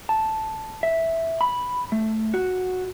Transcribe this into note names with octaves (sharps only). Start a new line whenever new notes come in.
A5
E5
B5
A3
F#4